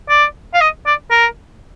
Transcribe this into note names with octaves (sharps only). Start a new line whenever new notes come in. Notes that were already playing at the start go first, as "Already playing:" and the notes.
D5
F5
D#5
D5
A#4